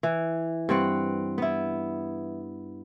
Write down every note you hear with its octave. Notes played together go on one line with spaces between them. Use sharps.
E3
G2 C4 F#5
B3 E4